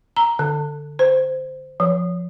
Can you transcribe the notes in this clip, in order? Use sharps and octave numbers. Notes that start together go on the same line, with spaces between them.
A#5
D3
C5
F3